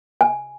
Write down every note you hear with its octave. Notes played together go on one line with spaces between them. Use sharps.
G#5